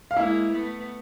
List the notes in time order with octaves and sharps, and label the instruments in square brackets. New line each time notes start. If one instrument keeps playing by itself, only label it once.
[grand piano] F5
[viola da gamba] G#3 A#3 [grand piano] E4 E5
[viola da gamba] A3 B3